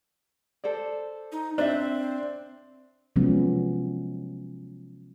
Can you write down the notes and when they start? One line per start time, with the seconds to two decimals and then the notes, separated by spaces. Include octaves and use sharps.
0.64 A4 C5 D5
1.32 D#4
1.58 C4 D4 C5 E5
3.16 C3 F3 F#3 G#3 B3 C#4